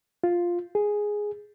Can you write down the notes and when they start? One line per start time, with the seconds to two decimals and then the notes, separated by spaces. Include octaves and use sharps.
0.24 F4
0.75 G#4